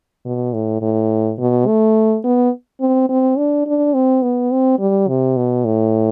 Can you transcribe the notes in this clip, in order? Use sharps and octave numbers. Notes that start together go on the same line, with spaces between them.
B2
A2
A2
B2
A3
B3
C4
C4
D4
D4
C4
B3
C4
G3
C3
B2
A2